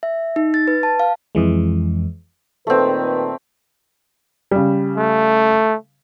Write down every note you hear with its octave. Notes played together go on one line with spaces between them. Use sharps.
E5
D#4
A6
B4
A5
F5
F2 E3 G#3
A#2 D#3 A3 C4 B4
C#3 G3
A3